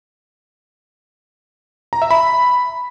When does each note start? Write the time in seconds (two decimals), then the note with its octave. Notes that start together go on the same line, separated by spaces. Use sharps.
1.93 A#5
2.02 E5
2.11 B5